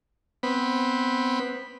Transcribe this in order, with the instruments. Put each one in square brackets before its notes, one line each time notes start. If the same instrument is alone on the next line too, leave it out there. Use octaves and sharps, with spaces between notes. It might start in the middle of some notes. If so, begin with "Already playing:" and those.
[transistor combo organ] B3 C4 B5